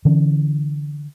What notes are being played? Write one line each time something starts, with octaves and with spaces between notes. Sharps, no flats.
D3 E3 C#4